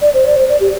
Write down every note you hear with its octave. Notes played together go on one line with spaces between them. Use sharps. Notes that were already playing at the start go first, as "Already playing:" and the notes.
D5
C5
D5
C5
D5
G4